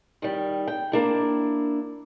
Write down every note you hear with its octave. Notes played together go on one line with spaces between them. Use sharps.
D#3 G3
G5
A#3 D4 E4